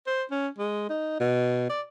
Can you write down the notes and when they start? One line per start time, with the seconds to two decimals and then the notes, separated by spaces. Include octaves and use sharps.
0.07 C5
0.31 C#4
0.58 G#3
0.90 D#4
1.20 B2
1.69 D5